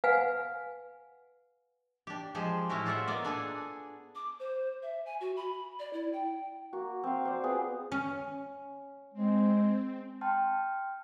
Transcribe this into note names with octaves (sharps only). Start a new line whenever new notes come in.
B4 F5 F#5 G#5
D4 G4
F3 G#3 G4 G#4 C5
A2 C#4 E4 F#4 G4
F4 C5 D5 E5 F#5
A#3 B3 D5 D#5
D4 G#4 A4 G#5
D6
C5
E5
G#5
F#4
B5
D5
E4
G5
A#3 F#4
C4 F5
C5 D5
B3 C4 F4 G#4
C#4
G#3 C4
G5 A5 C6 F6